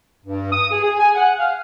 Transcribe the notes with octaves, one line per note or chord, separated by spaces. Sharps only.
G2
D#6
G#4
G#4
G#5
F#5
F5